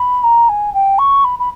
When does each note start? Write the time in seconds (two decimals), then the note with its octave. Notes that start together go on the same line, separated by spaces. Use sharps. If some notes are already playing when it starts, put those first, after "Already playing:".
Already playing: B5
0.24 A#5
0.49 G#5
0.74 G5
0.99 C#6
1.24 B5
1.39 B5